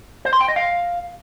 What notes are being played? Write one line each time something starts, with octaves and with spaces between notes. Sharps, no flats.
C5
C6
G5
D#5
F5